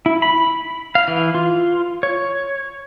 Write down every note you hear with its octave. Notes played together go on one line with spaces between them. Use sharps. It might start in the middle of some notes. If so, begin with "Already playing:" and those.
E4
B5
F5
E3
F4
C#5